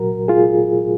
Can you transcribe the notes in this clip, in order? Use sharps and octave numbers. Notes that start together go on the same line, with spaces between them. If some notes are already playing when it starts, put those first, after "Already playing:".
Already playing: A#2 F#3 F#4 A#4
F4 G#4